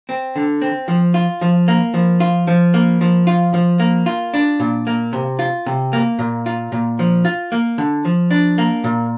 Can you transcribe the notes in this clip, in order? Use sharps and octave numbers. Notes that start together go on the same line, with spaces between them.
C4
D3
C4
F3
F4
F3
A#3
F3
F4
F3
A#3
F3
F4
F3
A#3
F4
D4
A#2
A#3
C3
F4
C3
A#3
A#2
F4
A#2
F3
F4
A#3
D3
F3
D4
A#3
A#2